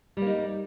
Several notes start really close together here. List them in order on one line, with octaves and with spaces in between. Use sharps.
G3 A#3 D#4